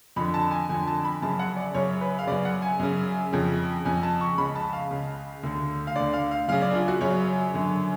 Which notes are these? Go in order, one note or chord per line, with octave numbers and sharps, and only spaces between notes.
F2 D3 B5
A5
G#5
F2 D3 G#5
A5
B5
F#2 C#3 A5
F#5
D5
F#2 C#3 C#5
B4
F5
F#2 C#3 D5
F#5
G#5
F#2 C#3
F2 C#3
F2 C#3 G#5
A5
C#6
C#2 C#3 B5
A5
F5
C#2 C#3
D2 D3
F5
D2 D3 D5
F5
F5
F#2 C#3 F5
D5
D4
F4
F#4
F#2 C#3 C#5
F#2 D3